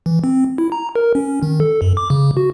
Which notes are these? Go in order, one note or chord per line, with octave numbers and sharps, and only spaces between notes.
E3
C4
E4
A#5
A#4
C#4
D#3
A4
F#2
D6
C#3
F#4